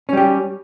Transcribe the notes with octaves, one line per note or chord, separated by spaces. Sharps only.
G3 C#4 G4